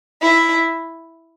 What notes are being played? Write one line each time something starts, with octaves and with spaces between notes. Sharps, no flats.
E4